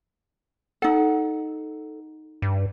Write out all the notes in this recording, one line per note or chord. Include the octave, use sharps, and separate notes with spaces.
D#4 A4 F#5
G2